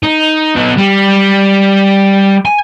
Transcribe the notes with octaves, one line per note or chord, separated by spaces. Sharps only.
D#4
B3 D#4
G3
G#5